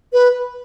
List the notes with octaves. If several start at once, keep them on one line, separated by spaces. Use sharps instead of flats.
B4